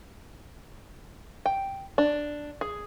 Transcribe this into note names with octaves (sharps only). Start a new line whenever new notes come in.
G5
D4
G#4